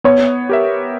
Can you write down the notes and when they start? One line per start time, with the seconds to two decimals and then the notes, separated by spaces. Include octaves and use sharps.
0.04 B3 C#5
0.49 G4 A#4 E5